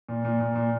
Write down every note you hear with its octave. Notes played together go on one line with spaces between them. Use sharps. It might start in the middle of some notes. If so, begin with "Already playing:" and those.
A#2
A#2
A#2
A#2